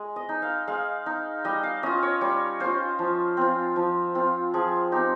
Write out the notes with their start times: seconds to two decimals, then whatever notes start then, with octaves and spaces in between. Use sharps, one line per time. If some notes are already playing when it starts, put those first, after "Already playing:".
Already playing: G#3
0.16 D#5
0.29 D#4
0.42 F5
0.67 G#3 F5
1.06 D#4
1.44 G3 D#5
1.63 F5
1.83 C#4 F4 D#5
2.03 C#5
2.21 G3 C#5
2.60 C#4 F4 C5
2.99 F3
3.37 C4 F4
3.76 F3
4.15 C4 F4
4.54 F3 G#4
4.92 C4 D#4 G4